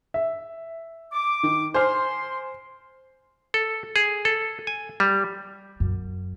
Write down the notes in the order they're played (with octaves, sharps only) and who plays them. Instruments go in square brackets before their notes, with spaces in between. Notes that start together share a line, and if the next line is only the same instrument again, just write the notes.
[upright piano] E5
[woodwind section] D6
[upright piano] D#3
[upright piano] C5 G#5 F6 [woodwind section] C6
[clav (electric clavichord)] A4
G#4
A4
G#5
G3
[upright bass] F#2